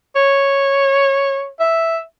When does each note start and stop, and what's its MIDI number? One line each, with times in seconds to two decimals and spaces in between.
0.16 1.47 73
1.60 1.99 76